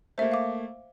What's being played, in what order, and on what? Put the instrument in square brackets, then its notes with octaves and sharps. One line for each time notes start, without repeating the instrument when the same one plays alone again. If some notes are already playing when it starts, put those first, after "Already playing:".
[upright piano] A3 A#3 [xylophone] C5 E5
[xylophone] F5 D6